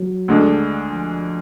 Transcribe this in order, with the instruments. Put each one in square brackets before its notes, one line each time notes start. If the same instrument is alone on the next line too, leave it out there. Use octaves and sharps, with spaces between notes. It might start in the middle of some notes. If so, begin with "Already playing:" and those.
Already playing: [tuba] F#3
[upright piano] D2 D3 G#3 D4
[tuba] F3